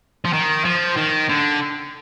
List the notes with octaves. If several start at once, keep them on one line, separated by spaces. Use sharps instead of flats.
F3
D#3
F3
D#3
D3